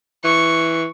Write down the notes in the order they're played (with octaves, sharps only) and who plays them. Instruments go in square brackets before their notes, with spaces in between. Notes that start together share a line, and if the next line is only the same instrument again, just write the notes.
[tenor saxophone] E3 [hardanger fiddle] C#6